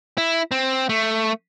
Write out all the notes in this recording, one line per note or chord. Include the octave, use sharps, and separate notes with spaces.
E4
C4
A3